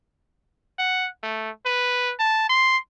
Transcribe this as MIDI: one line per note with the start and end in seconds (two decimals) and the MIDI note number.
0.78 1.09 78
1.23 1.50 57
1.66 2.14 71
2.19 2.45 81
2.49 2.77 84